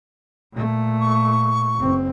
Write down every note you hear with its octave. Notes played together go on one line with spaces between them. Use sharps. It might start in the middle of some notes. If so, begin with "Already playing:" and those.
A#2 A3
C#6
F#1 C4